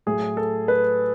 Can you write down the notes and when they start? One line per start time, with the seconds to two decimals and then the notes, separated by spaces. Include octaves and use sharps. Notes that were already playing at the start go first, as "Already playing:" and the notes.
0.06 A2 F#3 G#4
0.37 A4
0.68 B4